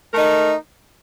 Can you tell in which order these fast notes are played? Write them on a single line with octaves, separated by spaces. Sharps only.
A#4 A3 D#4